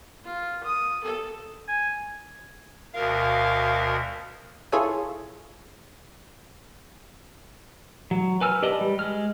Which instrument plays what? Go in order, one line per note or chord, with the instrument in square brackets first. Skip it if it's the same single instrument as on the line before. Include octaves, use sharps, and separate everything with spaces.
[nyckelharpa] F4
D#6
A4
[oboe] G#5
[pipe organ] D2 B2 A#4 [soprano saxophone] F5
[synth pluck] E4 F4 G#4 A4 C#5 G#5
[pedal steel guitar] F#3
B4 G#5 E6 F6
G4 B4 D5 D#5 A5
G3
G#3 F6